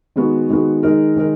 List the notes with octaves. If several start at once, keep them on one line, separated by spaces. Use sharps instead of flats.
D#3 G#3 B3 F#4
D#3 G#3 B3 F#4
D#3 G#3 D#4 A#4
D#3 G#3 D#4 A#4